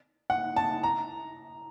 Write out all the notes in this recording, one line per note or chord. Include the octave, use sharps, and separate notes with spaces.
F#5
A5
A#5